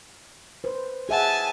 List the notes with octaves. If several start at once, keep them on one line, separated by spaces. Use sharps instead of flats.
B4 C5
G#4 E5 F#5 G#5 A5